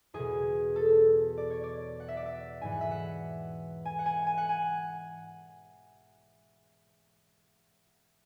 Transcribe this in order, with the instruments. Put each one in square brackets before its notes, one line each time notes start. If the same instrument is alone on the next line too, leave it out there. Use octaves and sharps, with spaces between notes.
[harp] E2 B2 G#4
A4
D5
C#5
D5
F#5
E5
D5
E5
G#2 E3 G#5
F#5
E5
F#5
G#5
F#5
G#5
G#5
F#5
G#5